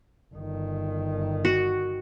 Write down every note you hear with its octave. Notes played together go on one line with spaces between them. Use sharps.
G1 D#3
F#4